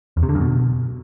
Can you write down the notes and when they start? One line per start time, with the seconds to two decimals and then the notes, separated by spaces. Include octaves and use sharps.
0.17 E2
0.23 C3
0.29 D3
0.35 F#2
0.41 B2